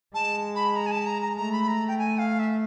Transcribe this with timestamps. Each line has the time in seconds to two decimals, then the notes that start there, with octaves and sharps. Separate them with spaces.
0.14 G#3 A5
0.55 B5
0.76 A#5
0.86 G#5
0.91 A5
1.06 A#5
1.22 A#5
1.37 A3 A#5
1.52 B5
1.68 A#5
1.88 G5
1.98 G#5
2.18 F5
2.39 E5